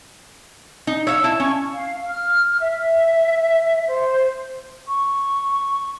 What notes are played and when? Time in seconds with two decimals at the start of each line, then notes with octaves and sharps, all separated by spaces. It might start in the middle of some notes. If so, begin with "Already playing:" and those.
0.87 D#4
1.07 C#5 E5 F5 E6
1.24 E4 A5
1.40 C#4 C#6
1.73 F5
2.07 F6
2.60 E5
3.89 C5
4.88 C#6